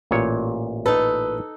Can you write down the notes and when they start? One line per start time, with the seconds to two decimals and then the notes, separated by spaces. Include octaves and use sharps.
0.11 A1 A#2 C#5
0.86 D#4 A4 B4